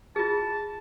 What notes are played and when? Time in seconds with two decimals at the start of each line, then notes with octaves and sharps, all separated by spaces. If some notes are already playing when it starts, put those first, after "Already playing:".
0.16 F4 G#4 A5